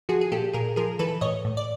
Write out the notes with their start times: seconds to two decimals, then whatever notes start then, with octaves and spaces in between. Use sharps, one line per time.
0.09 F3 F#4 G#4
0.21 G#4
0.32 A#2 G4 A4
0.53 A#2 G#4 A#4
0.76 F3 G#4 A#4
0.99 E3 A4 B4
1.21 A2 C#5 D#5
1.45 A2
1.57 D5